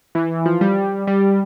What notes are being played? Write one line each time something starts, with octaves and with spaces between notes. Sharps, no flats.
E3
F3
G3
G3